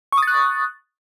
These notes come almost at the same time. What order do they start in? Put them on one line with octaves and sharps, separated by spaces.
C#6 D#6 A6 F#6